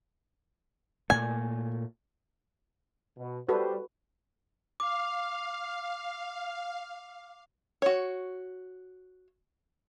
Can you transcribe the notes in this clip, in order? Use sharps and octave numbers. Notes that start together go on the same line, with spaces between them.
A#2 A3 G#5
B2
G3 F#4 A4 B4 C5
F5 D6
F#4 C#5